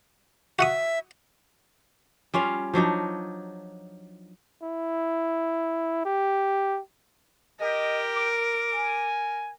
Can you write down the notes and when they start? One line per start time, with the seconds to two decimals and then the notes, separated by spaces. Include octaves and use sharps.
0.59 F#4 E5 F#5 D#6
2.34 G3 C#4 F4 F5
2.73 F3 F#3 D4 D#4
4.62 E4
6.05 G4
7.60 G4 A#4 D#5
8.16 D6
8.73 G#5